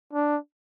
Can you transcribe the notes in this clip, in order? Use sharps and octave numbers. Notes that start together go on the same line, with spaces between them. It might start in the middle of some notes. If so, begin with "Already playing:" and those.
D4